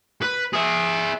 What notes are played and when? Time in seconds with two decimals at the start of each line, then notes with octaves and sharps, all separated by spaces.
0.22 B4
0.53 G#4 E5